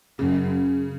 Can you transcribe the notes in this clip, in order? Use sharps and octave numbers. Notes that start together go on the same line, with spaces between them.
F#2 C#3